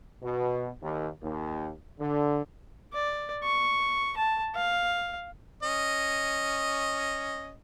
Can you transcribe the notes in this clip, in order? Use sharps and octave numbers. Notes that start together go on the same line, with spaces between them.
B2
D#2
D#2
D3
D5
C#6
A5
F5
C#4 D#5